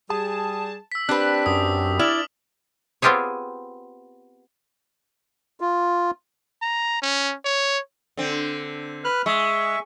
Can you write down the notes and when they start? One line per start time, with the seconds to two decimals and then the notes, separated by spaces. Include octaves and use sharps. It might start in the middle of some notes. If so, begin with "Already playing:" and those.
0.10 G3 G#4 A5
0.92 E6 B6
1.09 C4 D4 G4 B4 F#6
1.46 F#2 D#6
1.99 E4 D5 D6 F6 F#7
3.02 B3 C4 F4 G4 G#4 C#5
5.61 F4
6.62 A#5
7.02 C#4
7.45 C#5
8.17 D3 C4
9.04 B4 F6 F#6
9.26 G#3 E5 C#6